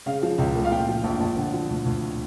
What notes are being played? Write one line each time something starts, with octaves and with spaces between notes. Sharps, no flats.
C#3 F5
F3
C#2
A3
F5
A#2 G5
F3
A#1
A#1
D3
F3
D2
D2